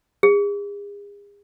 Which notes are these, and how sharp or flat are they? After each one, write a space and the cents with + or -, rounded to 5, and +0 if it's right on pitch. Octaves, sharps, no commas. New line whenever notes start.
G#4 -40